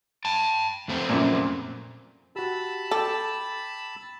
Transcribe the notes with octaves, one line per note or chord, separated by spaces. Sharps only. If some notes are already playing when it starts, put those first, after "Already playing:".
G5 A5
F2 A3 C4
F#2 A#2
F#4 G4 A5 B5 E6
A4 G5 D6